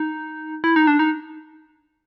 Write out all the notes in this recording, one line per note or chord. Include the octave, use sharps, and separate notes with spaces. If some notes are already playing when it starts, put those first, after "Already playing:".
Already playing: D#4
E4
D#4
D4
D#4